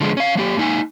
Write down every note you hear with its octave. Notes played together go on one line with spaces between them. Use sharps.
D3 F3 G#3 B3
C#4 F5
F#3 A#3 G4
A#3 D#4 G#5